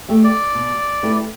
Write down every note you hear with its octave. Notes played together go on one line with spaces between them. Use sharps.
A3 G4 E5
D5
B2
A3 E4 G4 B4